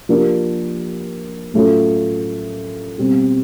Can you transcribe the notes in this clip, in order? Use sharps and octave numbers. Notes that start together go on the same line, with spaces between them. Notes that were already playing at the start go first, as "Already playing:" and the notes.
F3 A#3 D4 G4 A#4
A2 F#3 A3 C#4 F4
B2 G3 C4